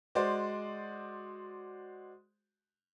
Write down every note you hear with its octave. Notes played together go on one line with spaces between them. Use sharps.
G#3 F#4 C5 D5